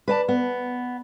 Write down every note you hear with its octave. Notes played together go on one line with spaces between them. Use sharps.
B4 D5 A5
B3